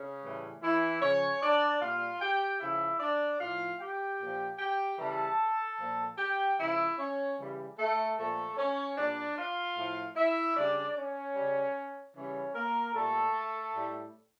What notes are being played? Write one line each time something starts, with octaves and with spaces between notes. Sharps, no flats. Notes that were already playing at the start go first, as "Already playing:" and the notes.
Already playing: C#3 C#4
A2 E3 G3
E3 E4
C#3 F3 C#4 C#5
D4 D5
A#2 G3 F4 F5
G4 G5
C#3 F3 E4 E5
D4 D5
A2 F3 F4 F5
G4 G5
A#2 F3
G4 G5
C#3 E3 G3 A4 A5
A#2 F3
G4 G5
C#3 F3 E4 E5
C#4 C#5
C#3 E3 G3
A3 A4
A#2 F3 A3 A4
C#4 C#5
A#2 G3 D4 D5
F4 F5
A2 F3
E4 E5
C#3 G3 D4 D5
C#4 C#5
C#3 G3
C#3 E3 G3 C#4 C#5
A#3 A#4
A#2 G3 A3 A4
A2 G3